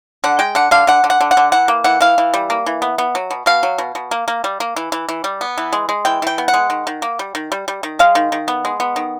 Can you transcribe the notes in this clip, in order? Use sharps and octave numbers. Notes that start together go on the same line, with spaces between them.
D3 F#5
G#3 G5
D3 F#5
D3 F5
D3 F#5
D3
F#5
D3
F#5
D3
E3 F#5
A#3
E3 F#5
E3 F5
E3
G3
A#3
E3
B3
B3
F#3
B2
B2 F5
F#3
B2
B2
A#3
A#3
G3
A#3
E3
E3
E3
G3
B3
E3
G#3
G#3
E3 G5
E3 G5
B3
F#5
G#3
D#3
D#3
A#3
G3
D#3
G3
G3
D#3
G#3 F5
D#3
D#3
B3
G#3
B3
D#3